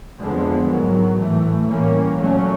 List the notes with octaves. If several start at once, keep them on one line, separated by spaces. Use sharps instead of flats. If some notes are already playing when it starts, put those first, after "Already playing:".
F2 D3 F3 G#3 B3
G#2 D#3 F#3
A2 E3 A3
A2 E3 G3 A#3 C#4
A#2 F#3 A3 C#4